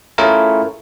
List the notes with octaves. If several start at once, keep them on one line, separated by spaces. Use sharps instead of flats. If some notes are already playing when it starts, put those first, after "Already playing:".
A3 C#4 E4 F4 G#4 A#4